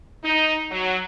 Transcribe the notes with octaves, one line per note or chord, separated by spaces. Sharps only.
D#4
F#3